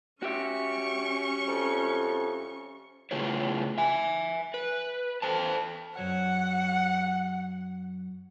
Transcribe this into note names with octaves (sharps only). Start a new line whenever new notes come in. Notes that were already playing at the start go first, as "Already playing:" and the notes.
C#4 F#4 G4 E5 C#6
F2
A2 C#3 F4 G#4 B4 C#5
E5 G#5
B4
A4 C5 A5
F#2 F#3 C#5 F#5